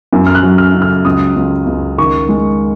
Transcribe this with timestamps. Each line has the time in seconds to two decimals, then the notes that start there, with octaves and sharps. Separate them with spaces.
0.13 F#2
0.27 F6
0.35 F#6
0.43 F#3
0.58 F6
0.75 C#3
0.82 F6
1.05 C#2 D#6
1.36 C#2
1.67 C#2
1.98 D#3 C#6
2.29 G#3